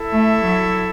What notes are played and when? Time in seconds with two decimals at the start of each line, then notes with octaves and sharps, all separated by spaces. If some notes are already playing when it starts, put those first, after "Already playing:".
Already playing: E4 A4 E5
0.12 A3
0.44 F#3